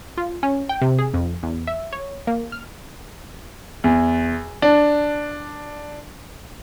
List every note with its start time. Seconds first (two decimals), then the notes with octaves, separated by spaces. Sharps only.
0.18 F4
0.43 C#4
0.69 G5
0.82 C3
0.99 G#4
1.14 F2
1.43 E2
1.67 E5
1.93 C#5
2.27 A#3
2.52 F6
3.84 E2
4.62 D4